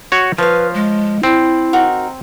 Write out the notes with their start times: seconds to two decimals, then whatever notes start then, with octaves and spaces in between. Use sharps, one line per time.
0.12 F#4 C#5
0.38 F3 B4 C#5 F5
0.74 G#3
1.23 C4 E4
1.73 D#4 F#4 A#4